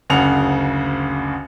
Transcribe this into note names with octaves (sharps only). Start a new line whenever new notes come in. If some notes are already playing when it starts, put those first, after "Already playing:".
F#1 D2 C#3 F#5 F7